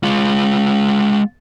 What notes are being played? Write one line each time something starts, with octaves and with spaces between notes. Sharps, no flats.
G#3 F4